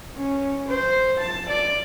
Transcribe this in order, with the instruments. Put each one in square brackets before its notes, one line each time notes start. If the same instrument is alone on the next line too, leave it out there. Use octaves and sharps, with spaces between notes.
[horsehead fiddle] C#4
C5
A5
D5